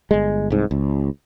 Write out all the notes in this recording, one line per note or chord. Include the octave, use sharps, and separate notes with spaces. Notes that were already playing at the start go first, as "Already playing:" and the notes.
G1 G#3
C2 G#2
C#2